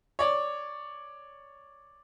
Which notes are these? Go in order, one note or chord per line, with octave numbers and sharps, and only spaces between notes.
C#5 D5